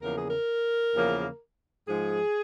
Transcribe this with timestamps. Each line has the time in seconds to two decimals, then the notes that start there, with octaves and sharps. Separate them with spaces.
0.02 E2 C#3 F3 A#3 A#4
0.15 G#4
0.28 A#4
0.95 E2 C#3 F3 A#3
1.87 G#2 F3 G#3 G#4